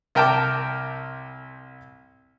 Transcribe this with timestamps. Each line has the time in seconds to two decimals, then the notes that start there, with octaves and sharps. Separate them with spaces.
0.15 C2 A#4 G5 A5 D6